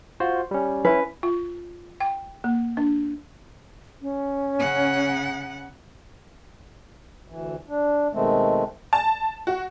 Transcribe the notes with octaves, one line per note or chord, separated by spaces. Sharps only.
F4 F#4 C5
G3 C#4
C#4 E4 B4
F4
G5
A#3
D4
C#4
C#3 F#5
D2 E3
D4
B2 D#3 G#3 A3 C4
A5
F#4